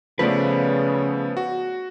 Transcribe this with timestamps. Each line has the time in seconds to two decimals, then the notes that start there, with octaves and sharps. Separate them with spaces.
0.19 C#3 F3 A3 B3 B4 D5
1.37 F#4